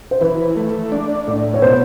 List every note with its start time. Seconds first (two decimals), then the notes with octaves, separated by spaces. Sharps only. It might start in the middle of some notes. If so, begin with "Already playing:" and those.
0.11 C5
0.21 E3 B4
0.56 A3
0.92 D4
1.27 A2
1.54 C#5
1.62 B2 C5